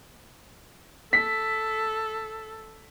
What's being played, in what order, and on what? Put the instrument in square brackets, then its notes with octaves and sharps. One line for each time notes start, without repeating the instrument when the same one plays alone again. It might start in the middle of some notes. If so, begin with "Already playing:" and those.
[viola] A4 [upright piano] B6